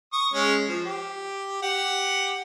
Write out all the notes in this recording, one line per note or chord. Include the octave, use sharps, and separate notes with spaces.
C#6 D#6
G#3 C#4
F3
G4
G4 F#5